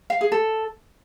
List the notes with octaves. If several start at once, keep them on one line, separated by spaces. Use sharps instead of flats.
F5
G#4
A4